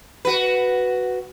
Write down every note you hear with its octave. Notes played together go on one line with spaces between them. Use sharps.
F#4 B4